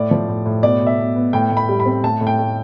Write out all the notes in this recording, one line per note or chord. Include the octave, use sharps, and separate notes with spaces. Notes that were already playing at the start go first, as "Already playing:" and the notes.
Already playing: A2 D5
F3
A2
A2
B2 D5
B2
E5
B2
B3
A2 G5
A2
B5
G3
B5
C4
A2 A5
A2
G5
A3